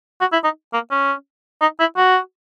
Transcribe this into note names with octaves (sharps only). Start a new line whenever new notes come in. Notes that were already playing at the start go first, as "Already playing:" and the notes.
F#4
E4
D#4
A#3
C#4
D#4
E4
F#4